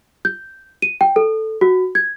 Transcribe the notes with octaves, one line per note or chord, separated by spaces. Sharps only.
G6
D#7
G5
A4
F#4
G#6